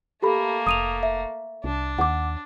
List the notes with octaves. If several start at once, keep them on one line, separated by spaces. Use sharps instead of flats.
A3 A#3 G4 A4 B5
F1 D#6 D#7 F7
E5
C2 D4
D#2 F#5 D6